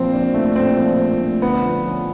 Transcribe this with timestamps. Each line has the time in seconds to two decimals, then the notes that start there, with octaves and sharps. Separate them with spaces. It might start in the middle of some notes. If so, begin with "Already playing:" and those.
Already playing: A#2 F3 C4
0.13 D4
0.34 A3
0.55 A#2 C4
0.77 F3
1.00 D4
1.21 A3
1.42 D3 B3
1.64 F3
1.86 C#4